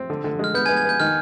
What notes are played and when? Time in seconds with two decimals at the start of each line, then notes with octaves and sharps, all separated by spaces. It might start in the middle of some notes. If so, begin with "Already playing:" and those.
Already playing: C4
0.10 D3
0.24 D3
0.39 G#3 F6
0.54 B3 G6
0.66 G#5 G#6
0.69 B3
0.77 G#5 G#6
0.85 B3 G6
1.00 D#3 F6